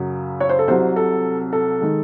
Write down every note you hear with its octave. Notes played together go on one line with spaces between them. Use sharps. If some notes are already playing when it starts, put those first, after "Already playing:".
Already playing: F#2 C#3 F#3
C#5
C5
A4
C2 C3 F#3 C5
A4
A4
D#3 G#3